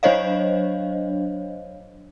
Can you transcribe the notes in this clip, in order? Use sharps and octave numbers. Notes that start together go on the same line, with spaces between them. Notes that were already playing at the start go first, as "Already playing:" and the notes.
F#3 D4 C5 C#5 D#5 F5